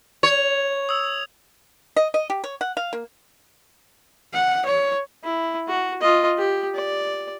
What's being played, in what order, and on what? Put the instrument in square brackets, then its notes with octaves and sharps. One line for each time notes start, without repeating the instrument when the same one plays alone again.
[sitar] C#5 [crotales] G#6 F7
[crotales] D#6 E6
[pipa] D#5
D#5
G4
C#5
F#5
F5
A#3
[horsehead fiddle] F#5
C#5
[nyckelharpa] E4
F#4
F4 D#5
G4
D5